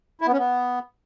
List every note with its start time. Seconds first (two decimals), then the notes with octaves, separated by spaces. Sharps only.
0.21 E4
0.27 B3
0.33 C#4
0.39 B3